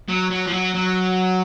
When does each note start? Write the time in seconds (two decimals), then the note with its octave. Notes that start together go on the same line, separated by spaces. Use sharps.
0.08 F#3
0.30 F#3
0.47 F3
0.52 F#3
0.74 F#3